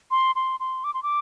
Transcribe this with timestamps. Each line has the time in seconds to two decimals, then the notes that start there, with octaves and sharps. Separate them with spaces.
0.11 C6
0.36 C6
0.60 C6
0.84 D6
0.94 C6
1.03 D6